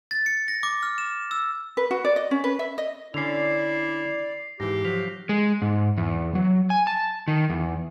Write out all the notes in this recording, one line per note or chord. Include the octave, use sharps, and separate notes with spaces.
A6
C#7
A#6
D6
F6
E7
E6
B4
F#4
D5
D#5
C#4
B4
E5
D#5
D3 C#4 E4 D5 C7 F7
G#2 E3 G4 A#6
F3 F#3 B6 F7
G#3
G#2
E2
F#3
G#5
A5
D#3
E2